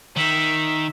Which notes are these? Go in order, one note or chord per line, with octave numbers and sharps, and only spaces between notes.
D#3 E5